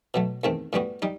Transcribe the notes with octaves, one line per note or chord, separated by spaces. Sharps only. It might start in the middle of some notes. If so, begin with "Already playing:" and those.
B2 F#3 A3
E2 D#3 A3 C4
A2 G3 B3 F#4
G3 D#4